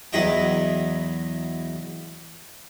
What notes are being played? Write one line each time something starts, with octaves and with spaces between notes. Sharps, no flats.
E2 F#3 E4 D#5 G5